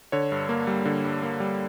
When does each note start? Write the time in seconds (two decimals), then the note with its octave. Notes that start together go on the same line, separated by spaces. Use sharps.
0.12 D3 C#5
0.32 G2
0.49 A#3
0.67 G3
0.85 D3
1.04 G2
1.23 A#3
1.40 G3